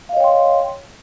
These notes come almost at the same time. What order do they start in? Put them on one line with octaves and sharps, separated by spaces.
F5 D#5 C#5 G5 C6